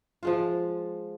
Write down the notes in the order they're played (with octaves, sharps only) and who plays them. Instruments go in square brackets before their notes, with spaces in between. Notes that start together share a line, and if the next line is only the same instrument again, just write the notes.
[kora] F3 G#3 F4